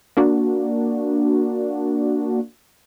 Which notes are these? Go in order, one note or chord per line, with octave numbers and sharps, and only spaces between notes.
A#3 D4 F#4